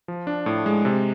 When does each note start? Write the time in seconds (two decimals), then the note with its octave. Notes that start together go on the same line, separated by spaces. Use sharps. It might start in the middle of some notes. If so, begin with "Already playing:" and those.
0.08 F3
0.27 D4
0.46 A2
0.66 G#3
0.85 C3